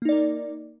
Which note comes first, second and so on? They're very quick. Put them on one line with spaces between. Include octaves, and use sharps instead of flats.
A#3 D#4 D5 A#4